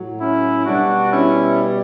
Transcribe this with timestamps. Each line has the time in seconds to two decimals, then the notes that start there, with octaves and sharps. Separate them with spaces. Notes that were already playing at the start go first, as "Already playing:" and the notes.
Already playing: A2 F#3
0.20 C#4 E4
0.66 B2 G3 D4 F#4
1.11 C#4 E4